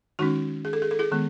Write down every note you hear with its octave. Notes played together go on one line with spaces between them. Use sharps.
D#3 G#3 C#4 D#4 F#4
G#4
A4
G#4
A4
E4 G#4
D#3 G#3 B3